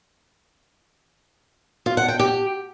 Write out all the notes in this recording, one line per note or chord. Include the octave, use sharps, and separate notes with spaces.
F4
F#5
G5
G4